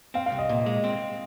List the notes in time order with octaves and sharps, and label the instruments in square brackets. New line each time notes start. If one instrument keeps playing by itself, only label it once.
[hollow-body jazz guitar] C4 [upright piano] F5
[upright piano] F5
[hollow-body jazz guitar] C2
[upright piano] D#5
[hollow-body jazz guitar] A#2
G#3
C4